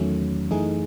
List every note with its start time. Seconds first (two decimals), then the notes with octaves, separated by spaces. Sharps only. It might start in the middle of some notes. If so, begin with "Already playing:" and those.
Already playing: E2 D#3 F#3 A3 C#4
0.51 F#2 E3 A3 D#4 G#4